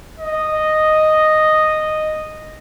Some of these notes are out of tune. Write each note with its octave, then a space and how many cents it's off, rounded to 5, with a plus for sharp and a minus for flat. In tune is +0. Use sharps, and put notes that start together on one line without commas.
D#5 -5